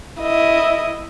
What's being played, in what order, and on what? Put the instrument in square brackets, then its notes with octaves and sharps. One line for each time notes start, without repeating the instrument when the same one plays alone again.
[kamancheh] E4 D#5